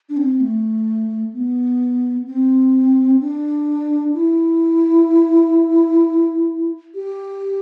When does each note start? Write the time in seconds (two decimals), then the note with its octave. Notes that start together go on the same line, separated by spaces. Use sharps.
0.09 D4
0.17 C4
0.41 A3
1.33 B3
2.27 C4
3.21 D4
4.14 E4
6.95 G4